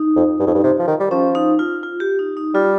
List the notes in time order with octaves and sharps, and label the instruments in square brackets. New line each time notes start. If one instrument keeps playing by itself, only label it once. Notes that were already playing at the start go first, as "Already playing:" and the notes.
Already playing: [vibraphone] D#4
[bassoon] F2
G2
F2
G2
C3
F3
D#3
G3
[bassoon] F3 [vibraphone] C#4
[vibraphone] D#4
F4
F4
G4
D#4
D#4
[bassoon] G3 [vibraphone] F4